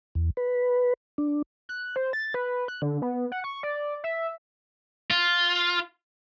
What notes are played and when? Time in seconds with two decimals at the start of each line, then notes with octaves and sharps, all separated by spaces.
0.15 E2
0.37 B4
1.18 D4
1.69 F#6
1.96 C5
2.13 A6
2.34 B4
2.68 F#6
2.82 D3
3.02 B3
3.32 F#5
3.44 C#6
3.63 D5
4.04 E5
5.10 F4